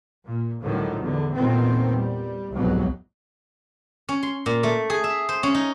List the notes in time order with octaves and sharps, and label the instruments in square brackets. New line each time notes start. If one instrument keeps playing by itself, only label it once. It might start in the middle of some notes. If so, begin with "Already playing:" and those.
[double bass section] A#2
C#2 A2 D3 D#3 F3 F#3
E2 D3
E2 A#2 D#3 A3 B3 C4
G3
C2 F2 G#2 B2 F#3
[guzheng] C#4
C6
A#2
A3
G#4
E5
C5
C#4
D#4